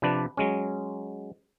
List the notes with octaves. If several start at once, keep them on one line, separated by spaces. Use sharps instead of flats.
C3 F3 D4 B4 D5
F#3 G#3 C#4